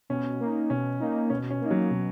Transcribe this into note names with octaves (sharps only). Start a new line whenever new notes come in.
B2 C#4
A#3 D#4
B2 C#4
A#3 D#4
B2 C#4
C#4
A#3 D#4
F#3
B2